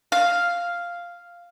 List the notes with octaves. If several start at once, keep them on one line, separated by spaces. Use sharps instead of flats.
F5